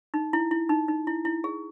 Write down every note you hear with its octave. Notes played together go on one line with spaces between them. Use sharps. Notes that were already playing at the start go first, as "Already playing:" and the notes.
D#4
E4
E4
D#4
D#4
E4
E4
G#4